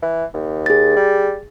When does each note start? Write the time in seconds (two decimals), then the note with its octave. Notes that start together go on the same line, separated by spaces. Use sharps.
0.02 E3
0.34 D#2
0.66 G#4 A6
0.96 G3